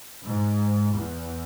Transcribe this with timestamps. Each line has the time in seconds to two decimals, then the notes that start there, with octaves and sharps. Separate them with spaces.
0.23 G#2
0.94 E2